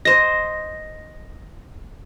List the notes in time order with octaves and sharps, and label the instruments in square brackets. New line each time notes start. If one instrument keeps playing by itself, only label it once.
[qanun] C5 D#5 [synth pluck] A#6